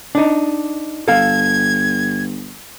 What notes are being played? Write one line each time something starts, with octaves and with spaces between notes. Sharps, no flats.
D4 D#4
G1 A4 F5 G#6